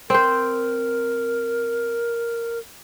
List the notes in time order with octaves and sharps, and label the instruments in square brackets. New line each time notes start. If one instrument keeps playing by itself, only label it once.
[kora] C4 C5 [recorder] A#4